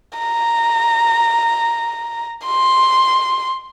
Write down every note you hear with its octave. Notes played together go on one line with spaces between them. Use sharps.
A#5
C6